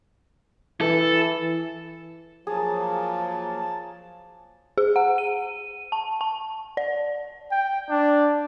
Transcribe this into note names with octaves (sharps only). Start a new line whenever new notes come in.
E3 A4
F3 F#3 A#3 G#4 A5
G#4
F#5
D#7
A5
A5
D5
G5
D4